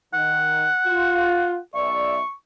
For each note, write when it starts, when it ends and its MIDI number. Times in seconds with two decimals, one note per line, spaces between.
0.14 0.67 51
0.14 1.59 78
0.86 1.58 65
1.74 2.19 35
1.74 2.19 74
1.74 2.19 76
1.74 2.32 85